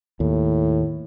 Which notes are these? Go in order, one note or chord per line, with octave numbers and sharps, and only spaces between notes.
D#2 A2